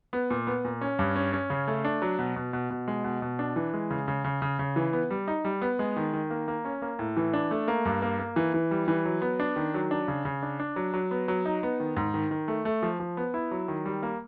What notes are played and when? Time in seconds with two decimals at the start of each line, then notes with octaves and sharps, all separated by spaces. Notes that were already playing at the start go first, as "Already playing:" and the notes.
0.13 B3
0.30 A#2
0.47 B3
0.65 A#2
0.81 C#4
0.99 G2
1.16 C#4
1.33 C#4
1.50 C#3
1.67 A3
1.85 D4
2.02 F#3
2.19 B2
2.36 B2
2.53 B2
2.70 B2
2.88 G#3
3.04 B2
3.22 B2
3.39 D4
3.56 E3
3.74 G#3
3.91 C#3
4.08 C#3
4.24 C#3
4.42 C#3
4.59 C#3
4.76 E3
4.93 B3
5.10 G3
5.28 D#4
5.45 G3
5.62 B3
5.79 G#3
5.97 D#3
6.13 D#3
6.31 A#3
6.48 A#3
6.65 C#4
6.82 A#3
6.99 A2
7.17 E3
7.33 D4
7.51 A3
7.68 A#3
7.85 G2
8.02 A#3
8.19 A#3
8.36 E3
8.54 E3
8.71 G3
8.88 E3
9.05 F#3
9.22 B3
9.40 D4
9.56 D#3
9.74 F#3
9.91 D4
10.08 C#3
10.25 C#3
10.43 D4
10.60 D4
10.76 F#3
10.94 F#3
11.11 B3
11.28 F#3
11.45 D#4
11.63 B3
11.80 D#3
11.97 G#2
12.14 D#3
12.31 D#3
12.48 A3
12.65 A3
12.83 F3
13.00 F3
13.17 B3
13.34 E4
13.51 F#3
13.68 D#3
13.85 G3
14.03 A#3